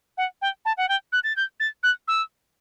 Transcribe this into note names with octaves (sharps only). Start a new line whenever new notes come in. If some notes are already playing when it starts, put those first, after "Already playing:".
F#5
G5
A5
F#5
G5
F#6
A6
G6
A6
F#6
E6